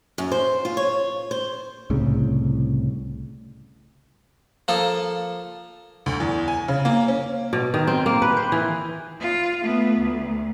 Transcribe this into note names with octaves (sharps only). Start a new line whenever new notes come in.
F#2
C5
F4
C#5
C5
C2 A2 C#3
F3 A#3 A4
D2
E2
G#5
C#3
A#3
C#4
B2
D#3
C4
A#3
B4
C5
E3
F4
A3 B3
D2